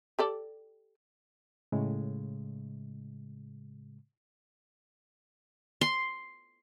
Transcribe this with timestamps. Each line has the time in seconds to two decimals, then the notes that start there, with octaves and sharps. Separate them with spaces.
0.19 G4 A4 D5
1.72 A2 C#3 G#3
5.81 C6